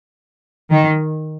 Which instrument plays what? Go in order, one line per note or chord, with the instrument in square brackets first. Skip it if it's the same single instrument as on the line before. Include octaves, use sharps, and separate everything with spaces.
[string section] D#3